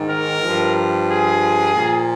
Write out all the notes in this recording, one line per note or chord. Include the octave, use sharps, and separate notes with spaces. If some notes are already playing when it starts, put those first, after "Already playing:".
Already playing: G#2 D#3
A#4
G2 F3
G#4
A#2 F3